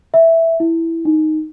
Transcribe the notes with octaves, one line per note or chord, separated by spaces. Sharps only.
E5
E4
D#4